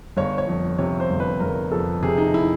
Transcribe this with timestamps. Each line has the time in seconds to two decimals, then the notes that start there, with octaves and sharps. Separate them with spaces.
0.17 G1 C#5
0.38 C#5
0.47 F2
0.78 C3 C#5
1.00 C5
1.10 G1
1.20 B4
1.40 G1 A#4
1.71 F2 A4
2.02 C3 G#4
2.18 D#4
2.34 E4